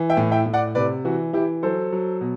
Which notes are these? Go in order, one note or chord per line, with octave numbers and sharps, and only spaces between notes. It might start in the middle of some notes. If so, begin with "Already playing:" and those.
Already playing: E3
E5 G5
A2
E5 G5
A2
D5 F#5
C3 B4 D5
E3 F#4
E3 E4 G4
F#3 A4 C5
F#3
B2